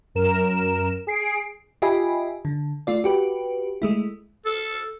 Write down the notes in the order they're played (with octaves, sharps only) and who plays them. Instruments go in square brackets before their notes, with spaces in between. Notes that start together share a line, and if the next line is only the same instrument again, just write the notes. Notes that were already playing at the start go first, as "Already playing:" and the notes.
[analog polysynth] F#2 A#4 E7
G#4 C7 D7
[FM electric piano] F4 G4 D#5 E5 G#5 B5
D3
A3 F4 D5
F#4 G4 B4
G#3 A3 E4
[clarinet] A4